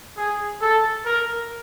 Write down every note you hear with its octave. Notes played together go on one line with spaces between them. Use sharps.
G#4
A4
A#4